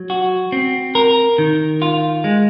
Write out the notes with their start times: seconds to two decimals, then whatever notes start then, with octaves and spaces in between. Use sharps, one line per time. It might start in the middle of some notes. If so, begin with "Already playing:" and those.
Already playing: F#3
0.10 F#4
0.52 C4
0.95 A#4
1.38 D#3
1.82 F4
2.24 G#3